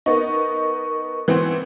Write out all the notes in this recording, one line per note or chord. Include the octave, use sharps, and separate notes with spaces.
B3 D#4 A#4 C#6
E3 B3 C4